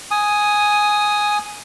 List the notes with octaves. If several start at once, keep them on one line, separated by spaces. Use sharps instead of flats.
G#5 D#6